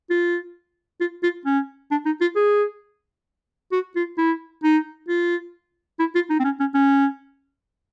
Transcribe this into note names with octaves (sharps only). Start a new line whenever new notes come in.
F4
F4
F4
C#4
D4
D#4
F4
G#4
F#4
F4
E4
D#4
F4
E4
F4
D#4
C4
C#4
C#4
C#4